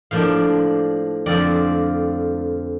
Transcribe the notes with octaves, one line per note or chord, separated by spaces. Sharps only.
A2 F3 A#3 D4 F5
F2 D3 F3 C4 D5